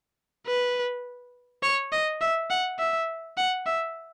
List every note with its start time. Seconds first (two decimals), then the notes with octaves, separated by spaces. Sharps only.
0.47 B4
1.63 C#5
1.92 D#5
2.21 E5
2.50 F#5
2.79 E5
3.37 F#5
3.66 E5